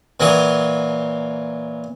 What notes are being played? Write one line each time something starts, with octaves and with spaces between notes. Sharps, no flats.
A#2 E3 F#3 D#6